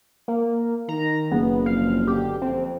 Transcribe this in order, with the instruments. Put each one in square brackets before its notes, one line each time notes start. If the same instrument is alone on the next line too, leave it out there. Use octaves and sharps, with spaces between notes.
[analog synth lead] A#3
[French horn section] D#3 [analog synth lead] A#5
[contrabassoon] F#1 [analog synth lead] B3 [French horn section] G#4
[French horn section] E2 F3 C4 [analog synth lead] F5
[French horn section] B2 D3 C4 [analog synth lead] G4
[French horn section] F2 [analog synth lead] C4